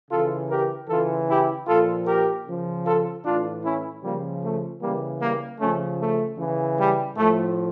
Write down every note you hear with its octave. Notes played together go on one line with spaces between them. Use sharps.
C#3 E3 F4 A4
G4 A#4
C#3 E3 F4 A4
E4 G4
A#2 F3 F4 A4
G4 A#4
C#3 F3
F4 A4
A2 E3 D4 F4
C#4 E4
C#3 F3 G3 A#3
A3
C#3 E3 G3 A#3
G3 A#3
C#3 F3 A3 C#4
A3
C#3 E3
G3
A2 F3 A3